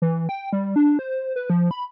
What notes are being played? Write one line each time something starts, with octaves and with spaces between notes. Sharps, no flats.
E3
G5
G3
D4
C5
B4
F3
B5